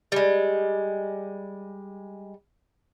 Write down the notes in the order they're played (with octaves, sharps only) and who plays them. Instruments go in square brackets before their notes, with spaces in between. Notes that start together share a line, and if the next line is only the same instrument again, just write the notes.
[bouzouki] G3 G#3